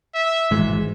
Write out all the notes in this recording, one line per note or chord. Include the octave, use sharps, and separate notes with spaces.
E5
G#1 G#2 E3 G#3